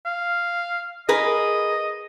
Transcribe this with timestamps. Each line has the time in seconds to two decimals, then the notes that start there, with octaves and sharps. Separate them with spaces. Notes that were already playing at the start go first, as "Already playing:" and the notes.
0.06 F5
1.09 G#4 A#4 B4 D#5